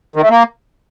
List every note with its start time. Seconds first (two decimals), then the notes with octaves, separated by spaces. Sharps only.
0.16 D#3
0.23 A3
0.30 A#3